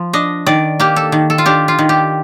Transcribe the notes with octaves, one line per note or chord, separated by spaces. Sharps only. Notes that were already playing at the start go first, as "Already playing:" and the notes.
Already playing: F3
D4 D#5
D#3 D5
A#3 G4
A4
D#3
A4
F4
D4 G4
F4
D#3
G4